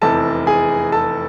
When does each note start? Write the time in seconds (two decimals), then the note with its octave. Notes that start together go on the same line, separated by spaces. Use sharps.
0.01 F1 E2 C3 A4 A5
0.47 G#4 G#5
0.92 A4 A5